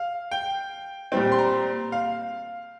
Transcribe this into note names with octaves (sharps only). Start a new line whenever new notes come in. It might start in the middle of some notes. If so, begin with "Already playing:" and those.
Already playing: F5
G5
A#2 G3 C4
C6
A#5
F5